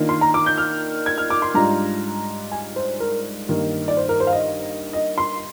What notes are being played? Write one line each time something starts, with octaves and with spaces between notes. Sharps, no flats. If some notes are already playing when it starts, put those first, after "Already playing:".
Already playing: D#3 A#3 D4 F4
C6
A#5
D6
G6
F6
G#6
F6
D6
C6
G#2 G3 D4 F4 A#5
G#5
C5
A#4
G2 D#3 A#3
D5
C5
A#4
C5
F5
D#5
D#5
C6